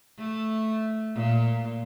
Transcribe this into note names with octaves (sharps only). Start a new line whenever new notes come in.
A3
A#2